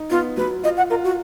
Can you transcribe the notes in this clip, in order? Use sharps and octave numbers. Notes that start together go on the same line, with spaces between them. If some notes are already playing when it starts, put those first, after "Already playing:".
Already playing: D#4
B3 F4
F#3 B4
F4 D#5
F#5
F4 A#4
F#4